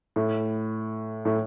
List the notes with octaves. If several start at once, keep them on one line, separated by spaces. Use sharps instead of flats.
A2
A2